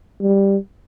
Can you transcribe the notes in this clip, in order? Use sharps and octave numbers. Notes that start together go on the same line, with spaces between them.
G3